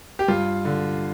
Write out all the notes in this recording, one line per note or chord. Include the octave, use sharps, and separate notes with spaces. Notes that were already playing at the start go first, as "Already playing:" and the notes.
G4
G2 F4
D3